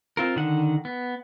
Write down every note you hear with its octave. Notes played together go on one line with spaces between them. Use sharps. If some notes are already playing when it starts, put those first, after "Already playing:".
C4 F4 A#4
D3 D#3 F#5
B3